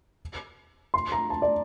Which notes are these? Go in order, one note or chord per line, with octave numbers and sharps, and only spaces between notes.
C6
A#5
A5
D5